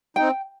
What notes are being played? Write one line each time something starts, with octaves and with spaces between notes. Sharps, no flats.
C4 D#4 G5